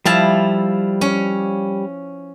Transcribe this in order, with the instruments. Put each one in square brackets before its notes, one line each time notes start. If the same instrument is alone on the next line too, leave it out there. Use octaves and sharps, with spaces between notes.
[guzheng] F3 E4 A5 [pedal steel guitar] G3 F5
[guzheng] C#4